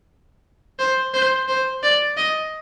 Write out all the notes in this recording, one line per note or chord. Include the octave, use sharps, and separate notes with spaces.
C5
C5
C5
D5
D#5